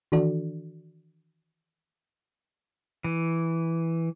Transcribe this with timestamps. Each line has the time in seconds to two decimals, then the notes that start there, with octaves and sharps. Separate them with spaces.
0.12 D#3 E3 D4 F#4 A4 D5
3.04 E3